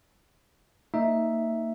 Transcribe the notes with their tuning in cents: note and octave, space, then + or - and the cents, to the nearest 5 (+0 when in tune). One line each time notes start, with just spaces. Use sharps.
A#3 -30 D#4 +5 E5 +0